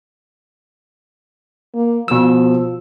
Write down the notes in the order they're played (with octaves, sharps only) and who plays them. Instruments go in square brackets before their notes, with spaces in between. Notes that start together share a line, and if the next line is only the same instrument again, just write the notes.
[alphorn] A#3
[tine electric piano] B2 E6 [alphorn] F3